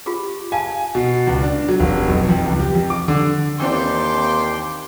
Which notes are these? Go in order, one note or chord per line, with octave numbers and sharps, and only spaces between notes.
F4 G4 G#4
F5 G#5 A5
B2
C#2
D4
F#3
F1
B1
F2
C#2
G4
F2
D6
D3
D#2 E3 C4 D4 G5 C6 D6